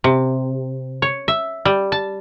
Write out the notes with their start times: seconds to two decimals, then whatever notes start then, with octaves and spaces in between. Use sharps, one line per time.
0.04 C3
1.02 C#5
1.28 E5
1.65 G3
1.92 A5